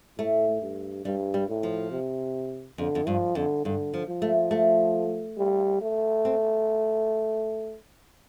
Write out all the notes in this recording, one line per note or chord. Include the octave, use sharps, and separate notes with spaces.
A2 A3
G2
G2 G3
G3
A2
F3
C3
F2 D3
F2
G2 F3
F2 D3
G2 D3
F3
F3
A3
A3
G3
A3
C4